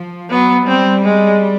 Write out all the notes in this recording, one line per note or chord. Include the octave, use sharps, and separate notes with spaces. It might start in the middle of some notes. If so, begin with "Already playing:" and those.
Already playing: F3
F#3 B3
G3 C4
G#3